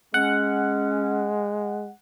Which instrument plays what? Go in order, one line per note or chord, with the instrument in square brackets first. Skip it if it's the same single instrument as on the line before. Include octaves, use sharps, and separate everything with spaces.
[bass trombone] G#3 [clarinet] C#4 [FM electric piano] F#5